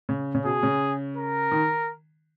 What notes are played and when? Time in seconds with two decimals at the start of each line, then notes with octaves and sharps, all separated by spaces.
0.09 C#3
0.35 C#3
0.45 B2 G#4
0.63 C#3
1.17 A#4
1.52 D#3